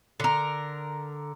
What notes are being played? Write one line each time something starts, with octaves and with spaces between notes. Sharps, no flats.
D3 A#4